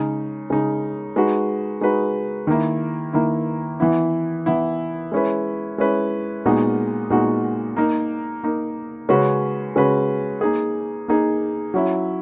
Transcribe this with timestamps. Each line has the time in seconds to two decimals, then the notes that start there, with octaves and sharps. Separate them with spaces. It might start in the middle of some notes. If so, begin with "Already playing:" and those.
Already playing: C#3 G#3 D#4
0.50 C#3 G#3 D#4
1.16 G#3 D#4 F#4 B4
1.81 G#3 D#4 F#4 B4
2.47 D#3 A#3 E4
3.13 D#3 A#3 E4
3.80 E3 B3 E4
4.46 E3 B3 E4
5.12 G#3 C#4 E4 B4
5.78 G#3 C#4 E4 B4
6.45 A#2 G#3 B3 D#4 F#4
7.10 A#2 G#3 B3 D#4 F#4
7.76 A#3 D#4 A#4
8.43 A#3 D#4 A#4
9.09 C#3 G#3 C#4 F#4 B4
9.76 C#3 G#3 C#4 F#4 B4
10.41 A#3 D#4 G#4
11.08 A#3 D#4 G#4
11.74 F#3 C#4 E4